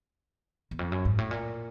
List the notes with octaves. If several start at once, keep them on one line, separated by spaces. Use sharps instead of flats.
E2
F2
F#2
G#2
A2
A#2